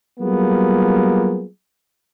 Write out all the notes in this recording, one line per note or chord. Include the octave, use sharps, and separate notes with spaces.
F#3 G3 A#3 B3 F4 G#4